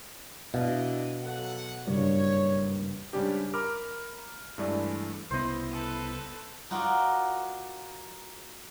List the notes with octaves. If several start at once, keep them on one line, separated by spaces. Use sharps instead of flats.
B2 D4 E4 D#5 F5
F#3 A4 F#5
F#1 G2 C#5
G#2 C#3 G3 C#4 D4 G4
A#4 A#5 B5 D6 F6
G2 E3 G#3 A3 E4 D5
C2 C#3 B3 E4 C5 D#5
A4 B4
D#4 F4 F#4 A#4 D5